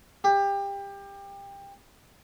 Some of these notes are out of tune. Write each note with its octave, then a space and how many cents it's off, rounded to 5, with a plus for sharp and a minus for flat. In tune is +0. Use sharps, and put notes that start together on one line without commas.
G4 +25